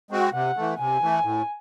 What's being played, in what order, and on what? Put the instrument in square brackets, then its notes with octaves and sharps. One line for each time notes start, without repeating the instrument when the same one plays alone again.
[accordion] G#3 C4 F#4
[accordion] C3 [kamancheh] F#5
[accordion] E3 A3
[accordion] C3 [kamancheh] G#5
[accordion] E3 A3
A2